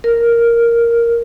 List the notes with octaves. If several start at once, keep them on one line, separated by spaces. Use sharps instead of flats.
A#4